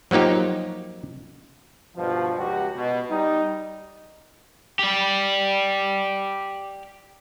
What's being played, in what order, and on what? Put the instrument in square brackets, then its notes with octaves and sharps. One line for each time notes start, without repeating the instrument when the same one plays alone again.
[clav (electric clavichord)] F3 F#3 A#3 D#4 G4
[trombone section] G2 B2 F3
C#2 F#4 G4
B2
G3 D#4
[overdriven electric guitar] G4 D5